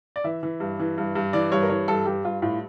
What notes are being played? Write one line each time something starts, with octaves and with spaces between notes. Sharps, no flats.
D5
E3 E5
E3
G2
E3
G2
G2
E3 D5
G2 C#5
A#4
E3 C#5
G2 A4
G2 G4
G2 F4
A2 F4